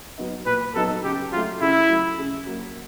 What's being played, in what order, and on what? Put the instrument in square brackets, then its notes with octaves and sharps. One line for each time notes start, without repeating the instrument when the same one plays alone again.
[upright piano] F#3 B3 D#4
[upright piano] A#2 [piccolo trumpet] B4
[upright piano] F#3 B3 D#4 [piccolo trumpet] A4
[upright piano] C#3 [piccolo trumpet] G4
[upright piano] F#3 [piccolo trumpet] F4
[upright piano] A3
[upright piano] C#3 [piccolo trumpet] E4
[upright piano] F#3 A3
C#3
F#3 A#3